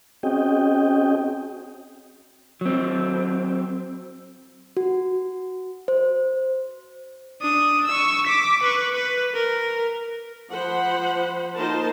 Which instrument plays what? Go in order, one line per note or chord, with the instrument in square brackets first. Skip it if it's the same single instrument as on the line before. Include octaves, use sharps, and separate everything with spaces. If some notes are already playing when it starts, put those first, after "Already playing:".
[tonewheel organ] C4 C#4 F#4 G#4 D#5 G5
[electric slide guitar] F#3 C4
[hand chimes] F#4
C5
[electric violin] D4 D#6
C#6 E6
D6 B6
B4 C#6
B4
A#4
[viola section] F3 C5 F#5 B5
A#3 D#4 F4 A#4 C5 A5